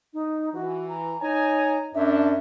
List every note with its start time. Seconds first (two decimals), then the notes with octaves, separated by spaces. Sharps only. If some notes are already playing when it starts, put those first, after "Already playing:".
0.14 D#4
0.54 E3 F#4
0.89 A#5
1.21 D#4 C#5 G#5 A#5
1.95 F#2 D4 E5